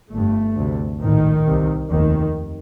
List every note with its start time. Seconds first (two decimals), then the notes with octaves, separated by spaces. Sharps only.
0.12 G1 G2 A3
0.57 D2 C3
1.02 A#1 A2 D#3
1.47 C2 C3
1.91 F1 D#2 D#3